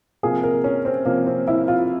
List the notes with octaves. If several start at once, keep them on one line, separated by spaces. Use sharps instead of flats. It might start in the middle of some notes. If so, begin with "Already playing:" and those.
C3 F3 A#3 G#4
A#4
C#4
C4
C3 F3 A#3
C4
E4
F4